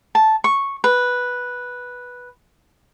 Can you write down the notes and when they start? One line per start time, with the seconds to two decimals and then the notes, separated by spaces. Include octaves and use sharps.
0.15 A5
0.44 C#6
0.84 B4